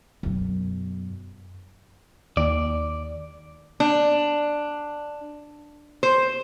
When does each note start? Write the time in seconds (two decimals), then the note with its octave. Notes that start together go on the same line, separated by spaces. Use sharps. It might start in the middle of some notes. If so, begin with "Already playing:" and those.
0.23 F#2 B2
2.37 D#2 D5
3.80 D4
6.03 C5